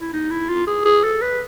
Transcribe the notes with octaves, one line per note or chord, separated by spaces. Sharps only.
E4
D#4
E4
F4
G#4
G#4
A4
B4